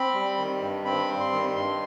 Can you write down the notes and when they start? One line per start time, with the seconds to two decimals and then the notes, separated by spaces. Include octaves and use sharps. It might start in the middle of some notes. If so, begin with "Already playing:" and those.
Already playing: C4 B5
0.14 G3
0.38 D#3
0.61 G2
0.85 C4 B5
1.09 G3
1.20 C6
1.32 D#3
1.56 G2 C6